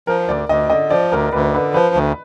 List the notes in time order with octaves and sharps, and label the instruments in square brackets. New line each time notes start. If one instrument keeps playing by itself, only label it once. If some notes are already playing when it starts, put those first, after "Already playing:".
[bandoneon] F3 [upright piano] A#4
[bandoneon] D2 [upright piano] D5
[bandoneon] D2 [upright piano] D#5
[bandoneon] D3 [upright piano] D#5
[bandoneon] F3 [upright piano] D5
[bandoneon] D2 [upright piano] A#4
[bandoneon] D2 [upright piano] B4
[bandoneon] D3 [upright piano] B4
[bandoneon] F3 [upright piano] B4
[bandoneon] D2